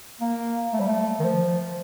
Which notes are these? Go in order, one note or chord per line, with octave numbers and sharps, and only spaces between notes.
A#3
A3
G3
A3
D#3
F3